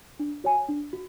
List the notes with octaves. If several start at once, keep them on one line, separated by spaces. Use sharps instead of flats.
D4
F#4 C#5 G#5
D4
F#4